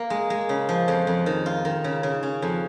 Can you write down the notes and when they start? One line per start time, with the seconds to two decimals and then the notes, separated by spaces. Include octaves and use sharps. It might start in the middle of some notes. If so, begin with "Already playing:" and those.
Already playing: A#3
0.10 G#3
0.30 G#3
0.49 C#3
0.69 F3
0.88 F2
1.07 F2
1.26 D#3
1.46 F4
1.65 D#3
1.84 C#3
2.03 C#3
2.23 C#4
2.42 F2